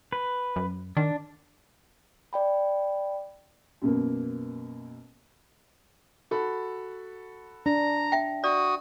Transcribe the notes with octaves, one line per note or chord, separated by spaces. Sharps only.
B4
F#2
D#3 D4
D5 G5 B5
F#2 B2 A#3
F#4 A4 B5
D4 A#5
E5 G5
F#4 D5 D#6